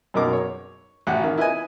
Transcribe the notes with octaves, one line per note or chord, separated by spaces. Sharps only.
F#2 B2 A#3 D#4 A#4 D6
C#5
A1 F#4 F#5 G5
D#3
E4 B4 D#5 G#5